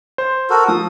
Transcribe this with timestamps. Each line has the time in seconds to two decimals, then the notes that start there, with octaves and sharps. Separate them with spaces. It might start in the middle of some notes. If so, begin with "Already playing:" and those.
0.18 C5
0.50 F#4 A4 A#4
0.68 F3 D#6